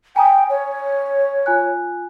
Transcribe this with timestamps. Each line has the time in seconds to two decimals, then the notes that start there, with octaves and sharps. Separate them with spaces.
0.16 G5 G#5 A#5 D#6
0.50 C#5
1.46 F4 G#5 F#6